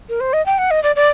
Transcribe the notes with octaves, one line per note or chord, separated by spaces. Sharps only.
A#4
C5
D#5
G5
F#5
D#5
D5
D5